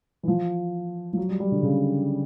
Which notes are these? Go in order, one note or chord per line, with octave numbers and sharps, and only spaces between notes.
E3
F3
F3
F#3
G3
G3
D3
C#3